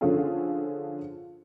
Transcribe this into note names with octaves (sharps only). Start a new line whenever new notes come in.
D3 F3 C#4 F4 G#4 A4